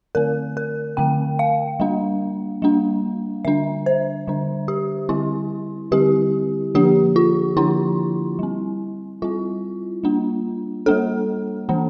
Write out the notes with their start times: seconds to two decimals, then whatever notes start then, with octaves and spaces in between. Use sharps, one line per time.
0.15 D3 A3 C4 A#4
0.57 A#4
0.97 D3 A3 C4 G5
1.39 F5
1.80 G3 A#3 D4
2.62 G3 A#3 D4
3.45 D3 G3 D4 E5
3.86 C5
4.28 D3 G3 D4
4.68 G4
5.09 D3 G3 C4 E4
5.92 D3 G3 C4 G4
6.75 D3 F3 A#3 D4 G4
7.16 F4
7.56 D3 F3 A#3 D4 E4
8.39 G3 C4
9.22 G3 C4 F4
10.04 G3 A#3 D4
10.86 G3 A#3 D4 A4
11.69 E3 A#3 D4